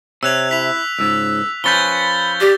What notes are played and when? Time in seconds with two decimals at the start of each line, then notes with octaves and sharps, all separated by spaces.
0.23 C3 C#5 E6 F#6 F7
0.51 E4 B6 F7
0.99 C#2 G#2 E6
1.64 F3 C#4 B4 B5 G6 A6 G7
2.41 G4 D5